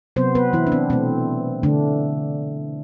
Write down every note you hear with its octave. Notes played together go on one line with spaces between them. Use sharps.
C3 F#3 B3 C4 C5
B3 B4
E3 E4
D4
C4
B2 A3 C4
D3 A3 D4